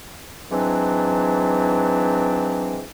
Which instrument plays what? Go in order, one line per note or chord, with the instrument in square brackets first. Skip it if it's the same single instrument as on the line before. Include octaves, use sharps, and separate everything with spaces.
[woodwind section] G#2 E3 F#3 C4 D4